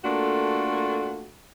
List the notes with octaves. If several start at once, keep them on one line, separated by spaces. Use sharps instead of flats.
A3 A#3 D4 F4 F#4 A4